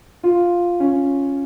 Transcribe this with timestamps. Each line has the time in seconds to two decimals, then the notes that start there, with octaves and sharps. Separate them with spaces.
0.23 F4
0.80 C#4